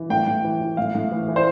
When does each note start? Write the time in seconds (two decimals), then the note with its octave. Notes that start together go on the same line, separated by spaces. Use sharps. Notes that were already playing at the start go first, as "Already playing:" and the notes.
Already playing: E3
0.10 A2 G5
0.27 A2
0.44 E3
0.61 E3
0.77 A2 F5
0.95 A2
1.12 E3
1.28 E3
1.36 C5